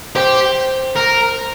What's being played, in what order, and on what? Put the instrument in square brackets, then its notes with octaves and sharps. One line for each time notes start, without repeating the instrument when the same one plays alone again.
[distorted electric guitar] G4 [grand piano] C5
[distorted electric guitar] A#4